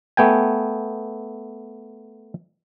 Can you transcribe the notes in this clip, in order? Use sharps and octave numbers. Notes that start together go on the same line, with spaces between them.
A3 B3 G5 G#5